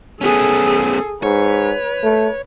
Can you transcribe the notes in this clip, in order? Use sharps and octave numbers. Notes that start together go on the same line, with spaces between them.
B3 C#4 G#4 A4
G#2 B4 C#5
A3